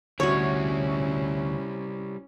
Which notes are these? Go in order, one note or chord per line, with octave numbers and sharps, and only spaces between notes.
D2 G3 C#4 E4 F#4 C#5